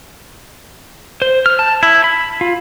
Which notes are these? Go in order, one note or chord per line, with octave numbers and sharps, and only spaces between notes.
C5
F6
A5
E4
B5
F4